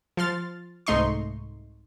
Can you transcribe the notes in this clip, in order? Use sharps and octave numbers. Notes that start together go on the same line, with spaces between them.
F3 C6 F6 A6
C2 G#2 A3 D#4 C6 C#6